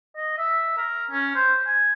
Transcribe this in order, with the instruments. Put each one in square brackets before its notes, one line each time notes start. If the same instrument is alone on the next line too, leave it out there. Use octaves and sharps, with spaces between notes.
[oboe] D#5
E5
A#4
C#4
C5
G#5